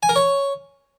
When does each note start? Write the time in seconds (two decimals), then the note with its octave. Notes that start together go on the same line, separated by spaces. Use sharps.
0.03 G#5
0.09 A#4
0.16 C#5